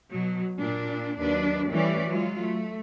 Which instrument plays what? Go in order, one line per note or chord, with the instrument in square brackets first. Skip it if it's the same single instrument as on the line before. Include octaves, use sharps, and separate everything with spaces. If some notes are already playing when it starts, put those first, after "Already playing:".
[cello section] B2 F#3
A#2 D4
D#2 F#3 D4 B4 D5
E3 G3 A3 C#4 G4 D5
F#3 G#3 F4
A3